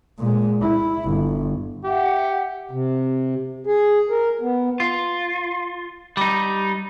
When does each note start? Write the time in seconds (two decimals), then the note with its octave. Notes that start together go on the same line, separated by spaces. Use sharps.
0.18 A#2 G#3
0.61 E4
1.04 G1
1.84 G4 E5 F#5
2.71 C3
3.66 G#4
4.10 A#4
4.41 B3
4.80 F4
6.17 G3 D#4